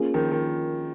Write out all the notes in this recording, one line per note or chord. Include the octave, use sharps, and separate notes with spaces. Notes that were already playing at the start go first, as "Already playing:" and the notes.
Already playing: A#3 C#4 F4 G#4
D#3 F3
D#3